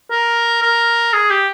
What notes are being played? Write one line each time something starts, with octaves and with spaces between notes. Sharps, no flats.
A#4
A#4
G#4
G4